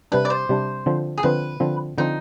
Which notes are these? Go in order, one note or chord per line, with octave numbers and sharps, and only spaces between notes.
C3 G3 D4 B4
D5
C5
C3 G3 D4
D3 F3 C4
G#4
D3 F3 C4 B4
D3 F3 C4
D3 F3 C4 D#4